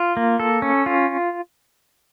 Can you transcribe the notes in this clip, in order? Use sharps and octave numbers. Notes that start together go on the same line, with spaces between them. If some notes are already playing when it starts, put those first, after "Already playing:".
Already playing: F4
A#3
A4
C#4
F4